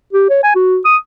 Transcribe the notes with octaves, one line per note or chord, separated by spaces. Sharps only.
G4
C#5
G#5
F#4
D#6